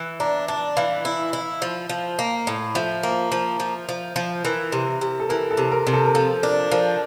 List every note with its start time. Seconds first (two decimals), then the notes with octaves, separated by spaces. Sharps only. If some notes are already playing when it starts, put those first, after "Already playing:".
Already playing: E3
0.20 D4 A#5
0.48 D4 A5
0.77 E3 F5
1.05 E4
1.33 E4
1.62 F3
1.89 F3
2.19 A#3
2.47 A2
2.75 F3 E5
3.03 A#3
3.32 F3
3.60 F3
3.89 F3
4.16 F3
4.45 E3 A#4
4.72 C3
5.01 C3
5.20 A4
5.29 E3 A#4
5.51 A4
5.57 C3
5.72 A#4
5.87 C3
5.93 A4
6.06 A#4
6.14 F3 A4
6.43 D4 A#4
6.71 F3 A#4